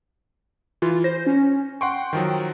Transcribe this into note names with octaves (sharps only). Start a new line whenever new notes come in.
E3 F4
C5 A#6
C#4
F#5 G5 C6 C#6
D#3 F3 F#3